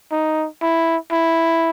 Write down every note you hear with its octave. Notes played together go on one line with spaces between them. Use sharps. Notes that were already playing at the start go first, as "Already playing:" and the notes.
D#4
E4
E4